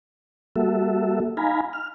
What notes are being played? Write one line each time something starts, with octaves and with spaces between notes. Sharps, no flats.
G3 A#3 F#4 A4 E5
D#4 F5 G#5 A#5 B5
F6